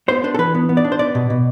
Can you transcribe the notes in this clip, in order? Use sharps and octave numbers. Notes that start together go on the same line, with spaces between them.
B3 C5
D4 C5
A4
E3 B4
B3
B3
D5
D4
C5
B3 D5
B2
B2